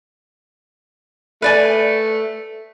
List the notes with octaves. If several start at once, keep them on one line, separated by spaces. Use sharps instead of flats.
A3 B4 D5 G#5